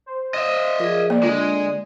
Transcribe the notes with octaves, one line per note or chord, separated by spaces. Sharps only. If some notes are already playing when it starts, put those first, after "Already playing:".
C5
D#5 E5
F3 G#4 A#4
A#3 D5
D3 G#3 F4